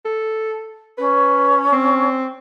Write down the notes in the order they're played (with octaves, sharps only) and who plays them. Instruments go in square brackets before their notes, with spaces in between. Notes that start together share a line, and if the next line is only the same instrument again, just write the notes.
[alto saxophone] A4
[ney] C#4 [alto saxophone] B4
[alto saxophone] C4